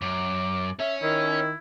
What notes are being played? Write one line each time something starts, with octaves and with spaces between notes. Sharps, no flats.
F#2 D6
C#4 E5
D#3 E4